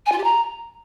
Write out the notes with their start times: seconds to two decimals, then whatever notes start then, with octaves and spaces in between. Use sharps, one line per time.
0.06 G#5
0.12 F4
0.18 G4
0.24 A#5